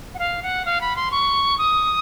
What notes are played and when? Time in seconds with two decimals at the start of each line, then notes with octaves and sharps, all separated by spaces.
0.14 F#5
0.19 F5
0.42 F#5
0.65 F5
0.81 B5
0.96 C6
1.11 C#6
1.58 D#6